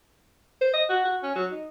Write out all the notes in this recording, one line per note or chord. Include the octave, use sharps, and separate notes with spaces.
C5
D#5
F#4
F#4
C#4
F#3
D#4